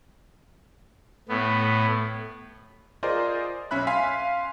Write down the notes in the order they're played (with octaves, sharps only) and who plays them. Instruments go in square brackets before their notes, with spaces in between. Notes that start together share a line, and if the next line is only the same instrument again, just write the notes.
[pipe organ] A2 B3
[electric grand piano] F4 G#4 A#4 C5 D5 D#5
B1 C#4 E5 B5 F#6
F5 G#5 C6 B6